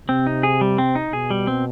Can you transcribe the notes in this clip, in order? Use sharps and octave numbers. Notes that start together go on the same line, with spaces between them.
C3 C4
D#4
G#4
G3
C4
D#4
B2 G#4
G3
C4